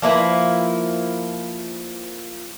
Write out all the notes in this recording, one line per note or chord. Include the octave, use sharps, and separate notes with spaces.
F3 A#3 E4 B4